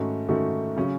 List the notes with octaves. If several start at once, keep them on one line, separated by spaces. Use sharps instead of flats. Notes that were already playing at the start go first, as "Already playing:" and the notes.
Already playing: G#2 D#3 A3 C#4 F#4
G#2 D#3 A3 C#4 F#4
C#3 F#3 C#4